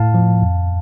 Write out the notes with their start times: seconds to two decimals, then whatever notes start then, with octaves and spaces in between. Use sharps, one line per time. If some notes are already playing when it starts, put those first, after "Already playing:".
Already playing: A2 F5 A5
0.14 F3
0.42 F2